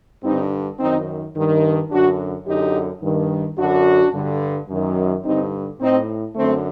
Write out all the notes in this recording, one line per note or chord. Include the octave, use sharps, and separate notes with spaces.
G2 D3 C4 D#4
F#2 D#3 C4 D#4
G2 D#3
F#2 D3 D4 F#4
F#2 D3 D#4 G4
G2 D#3
F#2 D3 D4 F#4
G2 D3
F#2 D#3
G2 D3 C4 D#4
A2 C4 D#4
F#2 D3 A3 C4